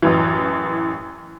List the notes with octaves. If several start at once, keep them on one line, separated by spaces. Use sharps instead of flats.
A1 F#2 E3